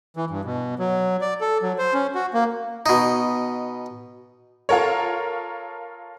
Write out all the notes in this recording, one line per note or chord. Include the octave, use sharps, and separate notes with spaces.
E3
G2
B2
F#3
D5
A4
F#3
C5
C#4
F#4
A#3
B2 D#4
F4 A4 A#4 C#5